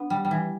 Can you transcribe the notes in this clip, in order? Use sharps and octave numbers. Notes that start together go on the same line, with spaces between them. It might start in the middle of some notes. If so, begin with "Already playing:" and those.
Already playing: B3 D4
G3
G3
E3